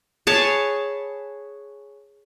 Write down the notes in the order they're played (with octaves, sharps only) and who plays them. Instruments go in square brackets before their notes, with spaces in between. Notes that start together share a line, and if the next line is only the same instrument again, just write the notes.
[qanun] G#4 B4 C#5 A5